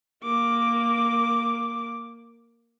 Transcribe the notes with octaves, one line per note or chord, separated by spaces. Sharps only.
A#3 D6